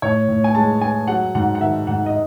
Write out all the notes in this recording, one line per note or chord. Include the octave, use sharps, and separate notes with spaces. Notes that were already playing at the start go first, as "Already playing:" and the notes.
A2 C#5
A2
G#5
G#3 A5
G#3 G#5
F#3 F#5
G#2 F#5
F#5
D#3 E5
G#2 F#5
D#5